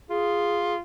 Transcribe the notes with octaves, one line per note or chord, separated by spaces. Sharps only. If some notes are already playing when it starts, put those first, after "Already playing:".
F4 G#4